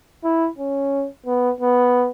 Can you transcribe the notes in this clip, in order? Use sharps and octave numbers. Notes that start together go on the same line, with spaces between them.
E4
C#4
B3
B3